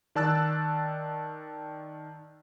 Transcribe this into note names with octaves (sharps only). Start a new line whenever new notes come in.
D#3 D5 A5 E6 F#6 A6